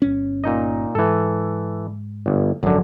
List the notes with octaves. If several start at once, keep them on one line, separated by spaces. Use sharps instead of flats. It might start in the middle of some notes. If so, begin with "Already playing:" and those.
G1 C#4
A#2 D#4 D#5
G#2 E3 A4
G1
G#1 F#2 D3 F3 F#3